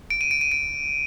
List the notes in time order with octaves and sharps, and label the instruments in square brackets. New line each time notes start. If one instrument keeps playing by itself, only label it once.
[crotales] D7
D#7
D7
D#7
D7